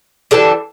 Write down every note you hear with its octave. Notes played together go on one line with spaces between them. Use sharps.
E3 G3 D4 A4